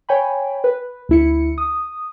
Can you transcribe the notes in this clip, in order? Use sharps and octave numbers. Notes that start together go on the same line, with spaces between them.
C#5 G5 G#5 B5
B4
D2 E4 C#7
D#6